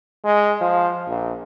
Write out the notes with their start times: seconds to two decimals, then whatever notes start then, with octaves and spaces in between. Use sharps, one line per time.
0.25 G#3
0.61 F3
1.08 A#1